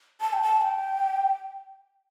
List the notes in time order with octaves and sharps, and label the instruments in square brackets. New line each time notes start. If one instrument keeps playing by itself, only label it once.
[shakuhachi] A5
G5
A5
G5